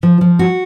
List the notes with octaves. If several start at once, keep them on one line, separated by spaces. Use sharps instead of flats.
F3
F3
F#4